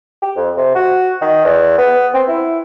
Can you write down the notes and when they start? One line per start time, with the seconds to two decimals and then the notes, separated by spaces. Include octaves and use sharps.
0.22 G4
0.36 F2
0.57 C3
0.75 F#4
1.22 D#3
1.45 E2
1.78 B3
2.14 C4
2.28 E4